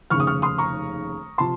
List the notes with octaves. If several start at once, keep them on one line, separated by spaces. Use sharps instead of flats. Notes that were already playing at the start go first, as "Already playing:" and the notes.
F1 D#2 C#3 C#6 F6
D#6
C#6 F6
C6 D#6
A#5 C#6
C3 F3 A5 C6